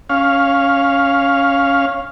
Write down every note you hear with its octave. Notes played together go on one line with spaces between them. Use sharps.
C#4 F5